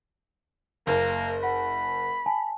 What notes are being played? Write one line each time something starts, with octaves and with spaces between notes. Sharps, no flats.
F#1 A#3
F#5 B5
G#5 A5